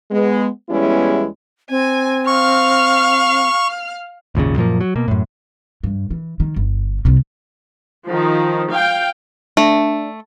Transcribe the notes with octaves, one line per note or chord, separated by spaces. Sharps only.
G#3 B3
E2 G3 G#3 B3 C#4 E4
C4 G#5
F5 C#6 F6
G#1 D#2 A#2 C#3
F#2 A#2 F3 A#3
F#3
B2 A#3
F#2 A2
G2
E3
D#3
G1
C2 C3
D#3 F3
F5 G5
A3 D4